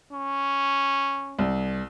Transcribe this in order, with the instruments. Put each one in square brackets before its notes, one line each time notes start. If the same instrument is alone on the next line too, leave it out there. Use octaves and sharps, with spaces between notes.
[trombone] C#4
[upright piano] C2